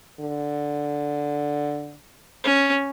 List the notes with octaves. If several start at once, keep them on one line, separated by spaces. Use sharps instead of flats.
D3
C#4